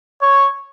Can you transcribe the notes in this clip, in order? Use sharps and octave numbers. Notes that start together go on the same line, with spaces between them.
C#5